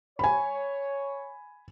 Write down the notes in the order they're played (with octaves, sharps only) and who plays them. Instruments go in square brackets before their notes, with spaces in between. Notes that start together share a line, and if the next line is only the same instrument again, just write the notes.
[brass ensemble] C#5 [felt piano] G#5 B5